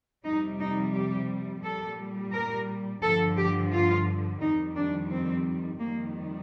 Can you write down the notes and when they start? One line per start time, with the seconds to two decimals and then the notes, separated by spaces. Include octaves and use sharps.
0.24 F2 C3 G3 D#4
0.59 D#4
0.94 G4
1.63 A#2 G3 A4
2.32 A#4
3.02 G2 D3 F3 A4
3.36 G4
3.72 F4
4.40 F2 D#3 G3 D#4
4.76 D4
5.10 C4
5.79 F2 D#3 G3 A#3